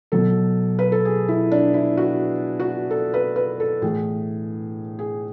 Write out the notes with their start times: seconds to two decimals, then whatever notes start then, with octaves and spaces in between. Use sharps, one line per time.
0.12 B2 F#3 A4
0.79 B4
0.92 A4
1.05 G#4
1.29 E4
1.52 D4
1.74 E4
1.97 F#4
2.60 F#4
2.91 A4
3.14 B4
3.36 B4
3.60 A4
3.82 A2 E3 G#4
4.99 G#4